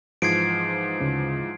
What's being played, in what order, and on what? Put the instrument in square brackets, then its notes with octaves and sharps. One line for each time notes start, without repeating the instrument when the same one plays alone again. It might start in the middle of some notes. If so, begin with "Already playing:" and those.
[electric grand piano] G#2 E3 F3 [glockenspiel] G#6 C7 D7
[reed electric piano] D2 C#3